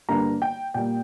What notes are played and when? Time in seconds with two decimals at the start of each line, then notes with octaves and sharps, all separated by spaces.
0.09 G2 D3 G3 A#3 A#5
0.42 G5
0.74 A#2 G3 A#3 G5